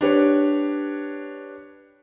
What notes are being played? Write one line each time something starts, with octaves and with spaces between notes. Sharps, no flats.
D4 G4 B4 C#5